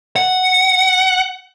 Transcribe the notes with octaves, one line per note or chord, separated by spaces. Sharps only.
F#5